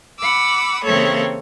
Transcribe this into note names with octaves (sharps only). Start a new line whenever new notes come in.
F#5 B5 D6 E6
C#3 E3 A#3 C4 A4 C#5